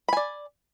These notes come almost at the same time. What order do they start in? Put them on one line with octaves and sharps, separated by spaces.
B5 G#5 D5